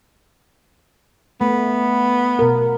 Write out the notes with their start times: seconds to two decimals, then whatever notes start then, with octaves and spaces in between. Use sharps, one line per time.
1.41 A3 B3
2.39 B2 A#4